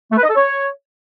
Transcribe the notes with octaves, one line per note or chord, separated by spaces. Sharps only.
A3
B4
D#5
A4
C#5